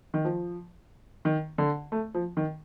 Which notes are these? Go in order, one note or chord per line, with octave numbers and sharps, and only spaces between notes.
D#3
F3
D#3
D3
A3
F3
D#3